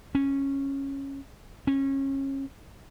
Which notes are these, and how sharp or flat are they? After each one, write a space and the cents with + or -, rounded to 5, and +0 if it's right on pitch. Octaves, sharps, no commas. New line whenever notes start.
C#4 -10
C#4 -25